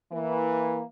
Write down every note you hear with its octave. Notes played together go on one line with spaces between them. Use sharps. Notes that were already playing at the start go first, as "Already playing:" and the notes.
E3 A#3